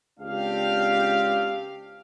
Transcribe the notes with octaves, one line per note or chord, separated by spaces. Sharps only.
C#2 C4 D4 G4 F5